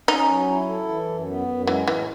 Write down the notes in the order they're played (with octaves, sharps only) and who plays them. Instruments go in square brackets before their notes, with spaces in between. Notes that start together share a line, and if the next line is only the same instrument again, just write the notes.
[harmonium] C#4 [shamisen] D#4
[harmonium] F#3
E4
A4
E3
F#2
B3
F#2
[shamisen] E3 [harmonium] G#3
[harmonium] A2 [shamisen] E3